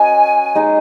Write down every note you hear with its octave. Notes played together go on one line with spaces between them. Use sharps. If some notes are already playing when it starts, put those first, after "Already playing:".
Already playing: C#4 F#4 A#4 D#5 G#5
G#3 D#4 G#4